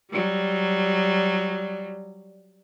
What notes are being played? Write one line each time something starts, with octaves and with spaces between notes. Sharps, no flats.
F#3 G3